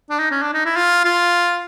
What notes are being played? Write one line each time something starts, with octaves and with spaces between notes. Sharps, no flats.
D4
D#4
C#4
D4
D#4
E4
F4
F4